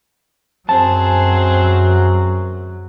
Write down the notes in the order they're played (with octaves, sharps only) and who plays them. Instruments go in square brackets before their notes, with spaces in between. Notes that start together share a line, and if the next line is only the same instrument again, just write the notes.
[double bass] F#2 F#3 [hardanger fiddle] C4 G#4 [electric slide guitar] A5